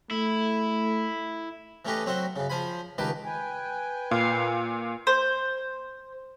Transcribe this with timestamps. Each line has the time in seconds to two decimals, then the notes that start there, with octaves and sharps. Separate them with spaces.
0.11 A3 E4
1.85 E3 A3 C#4 G4 B4 D#5
2.06 F#3 C4 F#4 E5 C6
2.36 F#2 C#3
2.50 F3 C5 G#5 B5
2.98 C#2 D#3 G4 B4 A5 D6
3.25 B4 G5 G#5
4.11 A#2 F5
5.07 C5